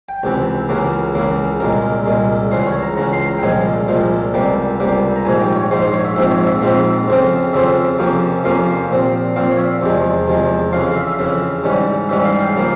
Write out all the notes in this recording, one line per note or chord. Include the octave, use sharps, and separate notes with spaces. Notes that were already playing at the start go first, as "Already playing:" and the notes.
G5
C#2 C3 E3
C#2 C#3 E3 A#3
C#2 C#3 E3 A#3
C2 A#2 G#3 A#4
C2 A#2 G#3
C#2 C#3 E3 C5
C#5
A#5
C#2 C#3 E3 A#5
C6
A#5
G5
C2 A#2 F3 G#3 G#5
C2 A#2 F3 G#3
C#2 C3 G3 A#3
C#2 C3 G3 A#3
A#5
A#1 G#2 F3 G#5
G5
C#5
A#1 G#2 F3 C5
C5
C#5
E5
A#1 G#2 F3 C4 E5
C#5
E5
A#1 G#2 F3 C4 E5
F2 C#3 F3 C4
F2 C#3 F3 C4 E5
F2 C3 F3 A#3 C#4
F2 C3 F3 A#3 C#4 F5
A#2 F3 C4
A#2 F3 C4 F5
C#5
E5
E2 C3 F3 G#3
E2 C3 F3 G#3
F2 C#3 E3 F5
F5
E5
E5
F2 C#3 E3
G#2 E3 G3 C#4
G#2 E3 G3 C#4 E5
F5
G5
F5
C#3 F3 A#3